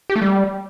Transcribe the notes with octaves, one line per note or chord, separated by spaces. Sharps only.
G4
A3
G3